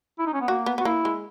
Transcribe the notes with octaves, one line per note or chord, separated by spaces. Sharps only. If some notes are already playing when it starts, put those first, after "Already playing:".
E4
D#4
C#4
B3
A#3 F#4
B3
B3 F#4
A#3 E4
G#3